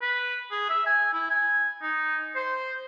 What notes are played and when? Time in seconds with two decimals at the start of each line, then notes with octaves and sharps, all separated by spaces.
0.02 B4
0.51 G#4
0.69 E5
0.86 G#5
1.14 E4
1.30 G#5
1.82 D#4
2.35 C5